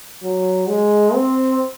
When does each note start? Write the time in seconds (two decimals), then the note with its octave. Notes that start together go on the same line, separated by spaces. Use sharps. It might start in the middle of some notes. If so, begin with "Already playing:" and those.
0.23 F#3
0.69 G#3
1.14 C4